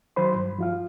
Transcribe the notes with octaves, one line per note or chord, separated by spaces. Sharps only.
D#3 F#3 C5 B5 C6
G2
F3 F4 F5